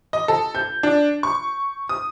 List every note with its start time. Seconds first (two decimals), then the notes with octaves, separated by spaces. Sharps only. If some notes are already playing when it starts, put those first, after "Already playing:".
0.13 D#5
0.28 A4
0.55 G6
0.83 D4
1.23 C#6
1.89 D#6